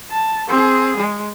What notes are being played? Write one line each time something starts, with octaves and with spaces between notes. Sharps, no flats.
A5
C4 G#4
G#3